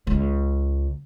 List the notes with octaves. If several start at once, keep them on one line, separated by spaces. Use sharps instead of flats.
C#2